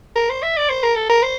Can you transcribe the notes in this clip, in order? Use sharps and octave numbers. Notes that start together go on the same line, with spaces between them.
A#4
C5
E5
D5
C5
A#4
A4
A#4
C5